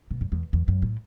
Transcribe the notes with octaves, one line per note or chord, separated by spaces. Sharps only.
B2
F#2
E2
E2
F#2
A2